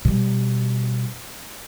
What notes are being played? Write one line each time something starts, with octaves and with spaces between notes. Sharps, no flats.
B2 G3